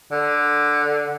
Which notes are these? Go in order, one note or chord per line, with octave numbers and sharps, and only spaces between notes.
D3